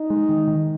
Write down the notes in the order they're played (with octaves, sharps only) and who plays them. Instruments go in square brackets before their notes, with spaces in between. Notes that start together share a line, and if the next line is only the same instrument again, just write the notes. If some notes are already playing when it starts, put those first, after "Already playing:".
Already playing: [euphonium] D#4
[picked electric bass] G#3
D#3
D#3